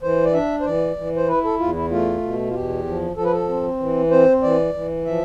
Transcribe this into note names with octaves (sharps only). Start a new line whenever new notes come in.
E3 C5
D5
D4 E5
C5
E3 D5
E3
C5
E4 B4
A4
E2 F4
E4
A3 F4
B2
F4
E2 G4
F3
F3 A4
B4
A4
C4
E3
C4 C5
E3 D5
E3
F3 E5